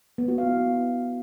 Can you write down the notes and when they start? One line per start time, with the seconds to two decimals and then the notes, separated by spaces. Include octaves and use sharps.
0.18 B3
0.28 F#4
0.38 F5
0.48 E4